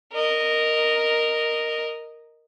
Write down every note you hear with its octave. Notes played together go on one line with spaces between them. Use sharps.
A#4 D#5